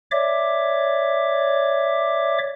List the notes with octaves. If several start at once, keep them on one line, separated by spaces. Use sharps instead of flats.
C#5 D5 E5 D6